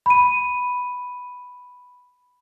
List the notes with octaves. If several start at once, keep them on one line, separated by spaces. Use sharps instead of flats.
B5 D#7